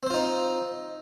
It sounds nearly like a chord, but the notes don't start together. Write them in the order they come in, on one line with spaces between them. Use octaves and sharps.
C4 C5 F4 D#4